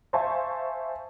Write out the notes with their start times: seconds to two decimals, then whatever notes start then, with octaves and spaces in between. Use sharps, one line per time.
0.13 C5 E5 F5 G#5 A5 C#6